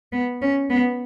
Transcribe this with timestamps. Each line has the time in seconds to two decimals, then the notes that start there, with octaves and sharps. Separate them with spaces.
0.12 B3
0.41 C#4
0.70 B3